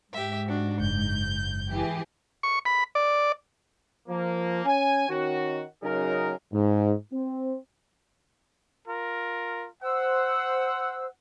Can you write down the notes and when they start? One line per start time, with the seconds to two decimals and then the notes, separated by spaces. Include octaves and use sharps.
0.13 G#2 G4 E5
0.47 D4 F#4
0.80 F#1 G6
1.71 E3 G4 G#4
2.43 C#6
2.65 B5
2.95 D5
4.09 F3 A#3
4.65 C#4 G#5
5.09 D#3 C#4 F#4
5.83 F#2 C#3 F#3 D#4 G#4 A#4
6.53 G#2
7.12 C4
8.87 F4 A#4
9.82 C5 F#5 E6